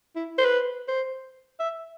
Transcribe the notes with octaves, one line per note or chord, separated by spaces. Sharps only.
E4
C5
B4
C5
E5